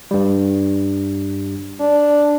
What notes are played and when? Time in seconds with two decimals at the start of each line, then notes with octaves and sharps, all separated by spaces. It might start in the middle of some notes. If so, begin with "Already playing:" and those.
0.11 G2 G3
1.80 D4